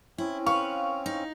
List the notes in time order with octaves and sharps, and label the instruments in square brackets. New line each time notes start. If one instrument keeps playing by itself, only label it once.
[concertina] C4 C#4 [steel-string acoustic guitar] E4
[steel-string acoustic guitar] B4 [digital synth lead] F5 [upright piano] C#6
[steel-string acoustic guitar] D#4